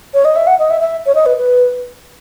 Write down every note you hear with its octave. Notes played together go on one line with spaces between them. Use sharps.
C#5
D#5
E5
F#5
D#5
E5
E5
C#5
D#5
B4
B4